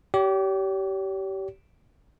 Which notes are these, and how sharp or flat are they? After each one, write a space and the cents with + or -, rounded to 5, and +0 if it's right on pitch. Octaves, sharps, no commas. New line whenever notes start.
G4 -25 C#5 +40